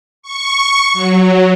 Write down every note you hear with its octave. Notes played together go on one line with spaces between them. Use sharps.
C#6
F#3